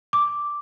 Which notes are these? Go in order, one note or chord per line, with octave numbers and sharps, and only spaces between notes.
D6